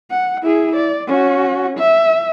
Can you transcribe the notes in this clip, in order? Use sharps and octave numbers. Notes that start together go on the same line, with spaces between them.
F#5
E4 G#4
D5
C#4 F#4
E5